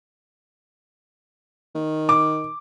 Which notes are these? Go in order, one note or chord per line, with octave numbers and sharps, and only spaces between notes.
D#3
D6